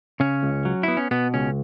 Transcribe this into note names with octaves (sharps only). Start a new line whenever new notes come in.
C#3 C#4
C#2
F#3
B3 E4
C#4
B2 B3
C#2 C#4